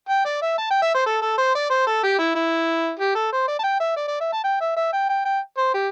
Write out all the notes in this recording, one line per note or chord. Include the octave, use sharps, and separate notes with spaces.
G5
D5
E5
A5
G5
E5
C5
A4
A4
C5
D5
C5
A4
G4
E4
E4
G4
A4
C5
D5
A5
G5
E5
D5
D5
E5
A5
G5
E5
E5
G5
G5
G5
C5
G4